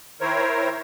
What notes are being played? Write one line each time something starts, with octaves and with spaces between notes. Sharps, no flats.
D#3 E4 A#4 C5 C#5